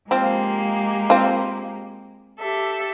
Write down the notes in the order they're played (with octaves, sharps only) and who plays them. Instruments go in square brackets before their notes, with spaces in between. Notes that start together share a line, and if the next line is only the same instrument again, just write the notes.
[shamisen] F3 C4 [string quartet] G#3 A#3 G4
[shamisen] C4 F4
[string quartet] G4 A4 E5